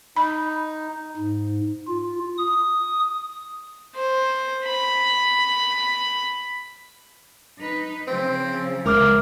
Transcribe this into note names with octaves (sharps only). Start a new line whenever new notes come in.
D#4 B5
G#2
F4
D#6
C5
B5
D#4 B4
C#3 F3 C4
C#2 A#4 E5 D6 F6